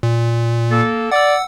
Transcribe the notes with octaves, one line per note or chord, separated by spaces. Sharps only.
A#2
A#3 A4
D5 F#5 E6